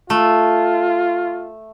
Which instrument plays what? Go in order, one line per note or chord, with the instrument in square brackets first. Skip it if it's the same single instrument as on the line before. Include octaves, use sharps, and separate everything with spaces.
[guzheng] A3 [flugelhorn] F4